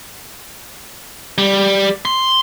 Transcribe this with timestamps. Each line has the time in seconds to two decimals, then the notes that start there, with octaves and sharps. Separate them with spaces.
1.38 G3
2.05 C6